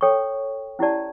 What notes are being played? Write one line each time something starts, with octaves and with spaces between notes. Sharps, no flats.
A4 C#5 G5 C#6
C#4 E4 G4 D5 A5